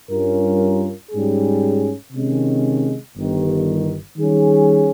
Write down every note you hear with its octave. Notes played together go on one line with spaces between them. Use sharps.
G2 G3 C#4 F4 A#4
G#2 G3 C#4 G#4
C3 D#3 G#3 C#4
G1 G2 D#3
D#3 G3 C#4 G#4